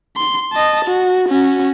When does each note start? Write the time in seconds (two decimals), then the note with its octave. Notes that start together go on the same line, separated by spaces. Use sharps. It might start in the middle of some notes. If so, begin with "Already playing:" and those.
0.16 C6
0.53 D#5 A5
0.85 F#4
1.29 C#4 F#4